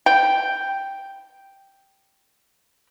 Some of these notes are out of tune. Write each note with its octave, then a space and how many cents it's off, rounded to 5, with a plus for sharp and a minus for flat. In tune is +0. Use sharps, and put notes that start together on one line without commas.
G5 +0